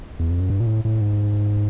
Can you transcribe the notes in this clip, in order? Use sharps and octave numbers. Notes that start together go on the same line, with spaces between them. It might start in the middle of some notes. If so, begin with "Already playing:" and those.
E2
F2
F#2
G2
A#2
A2
A2
G#2